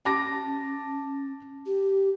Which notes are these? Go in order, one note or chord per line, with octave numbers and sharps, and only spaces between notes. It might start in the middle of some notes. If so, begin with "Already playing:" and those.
C#4 A5 D6 A#6
G4